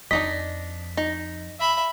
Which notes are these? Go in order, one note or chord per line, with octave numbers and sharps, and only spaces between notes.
F2 D4 D#4 D#5 B6
D#4
E5 B5